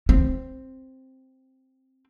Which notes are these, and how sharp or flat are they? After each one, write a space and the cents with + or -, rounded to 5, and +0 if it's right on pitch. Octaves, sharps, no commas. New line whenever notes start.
C4 +0